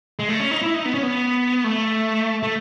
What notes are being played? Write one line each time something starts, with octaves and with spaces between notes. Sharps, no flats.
G#3
A3
C#4
D#4
E4
D#4
B3
C#4
B3
A3
A3